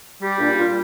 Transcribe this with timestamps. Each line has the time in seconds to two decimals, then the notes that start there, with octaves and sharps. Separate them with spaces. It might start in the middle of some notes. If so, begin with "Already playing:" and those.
0.22 G3 G4
0.39 A#2 D4
0.50 G4
0.57 A#2 F4